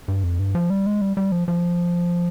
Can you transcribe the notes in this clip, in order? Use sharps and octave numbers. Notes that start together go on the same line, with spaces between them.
G2
F2
G2
F3
G3
G#3
G3
G3
F3
F3